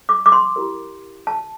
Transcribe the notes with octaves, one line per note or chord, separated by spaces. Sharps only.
D6
D6
C6
E4 G4 A#4
A5